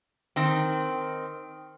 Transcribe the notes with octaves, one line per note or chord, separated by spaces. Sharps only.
D#3 C4